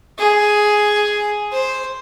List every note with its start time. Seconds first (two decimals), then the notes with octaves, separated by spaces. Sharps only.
0.19 G#4
1.52 C5